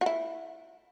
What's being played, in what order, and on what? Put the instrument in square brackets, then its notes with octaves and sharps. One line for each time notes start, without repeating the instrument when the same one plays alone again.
[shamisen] F#4
E4